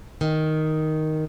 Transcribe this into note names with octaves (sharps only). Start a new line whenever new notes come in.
D#3